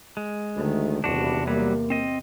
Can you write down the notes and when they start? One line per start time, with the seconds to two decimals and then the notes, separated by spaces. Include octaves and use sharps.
0.17 G#3
0.56 D2 D#3 A3
1.04 D#1 E2 C3 D4 F#4
1.47 F#3 G3 A#3
1.90 C4 D#5